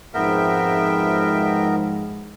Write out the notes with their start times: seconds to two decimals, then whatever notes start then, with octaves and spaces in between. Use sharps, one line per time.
0.14 F2 G#2 F3 G#3 B3 A#4 E5 G5